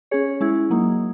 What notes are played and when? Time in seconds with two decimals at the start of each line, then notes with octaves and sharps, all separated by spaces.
0.11 C#4 G#4 C#5
0.41 G#3 C#4 E4 G#4
0.70 F#3 A#3 D#4